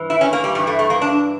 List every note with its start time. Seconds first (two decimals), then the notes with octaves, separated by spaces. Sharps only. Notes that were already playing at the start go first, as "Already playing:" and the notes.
Already playing: G2 E3
0.10 E4
0.21 C#4
0.33 A#3
0.44 G3
0.55 G2 E3 G3
0.67 A3
0.79 A3
0.90 A#3
1.02 D4